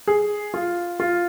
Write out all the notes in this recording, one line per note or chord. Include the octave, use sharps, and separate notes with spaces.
G#4
F4
F4